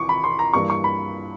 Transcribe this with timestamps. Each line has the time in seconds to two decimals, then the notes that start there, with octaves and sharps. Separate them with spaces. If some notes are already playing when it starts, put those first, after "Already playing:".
Already playing: C2 E3 C#6 D6
0.09 B5
0.24 C6
0.39 A#5
0.54 G2 E3 G3 A#3 C#6
0.70 C#6
0.84 B5